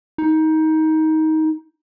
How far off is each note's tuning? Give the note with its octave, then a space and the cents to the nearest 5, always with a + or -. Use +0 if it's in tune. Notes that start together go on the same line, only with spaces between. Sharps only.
D#4 +20